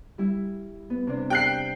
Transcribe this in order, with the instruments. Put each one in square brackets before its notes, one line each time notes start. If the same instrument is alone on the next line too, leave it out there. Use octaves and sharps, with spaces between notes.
[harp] G3 E4
B3
C3 D4
[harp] G4 [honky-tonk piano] G5 F#6 C7